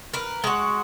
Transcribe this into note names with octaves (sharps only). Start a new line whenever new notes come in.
A#4 B4
G#3 F#4